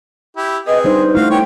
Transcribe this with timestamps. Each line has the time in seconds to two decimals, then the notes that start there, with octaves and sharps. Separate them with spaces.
0.37 E4 G4
0.67 C4 G#4 B4 D#5
0.84 G3 D4 D#4 C5
1.15 A3 E4 F#4 F5
1.30 B3 C#5 G5